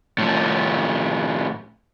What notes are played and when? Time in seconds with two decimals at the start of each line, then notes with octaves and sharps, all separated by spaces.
0.18 A2 F3